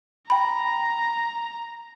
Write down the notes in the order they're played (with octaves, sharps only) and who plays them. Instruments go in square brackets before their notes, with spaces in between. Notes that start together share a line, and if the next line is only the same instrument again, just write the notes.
[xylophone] G5 B5 [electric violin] A#5